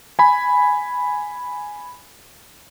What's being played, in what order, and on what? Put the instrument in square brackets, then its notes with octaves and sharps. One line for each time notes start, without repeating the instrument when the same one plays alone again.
[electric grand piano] G#5 B5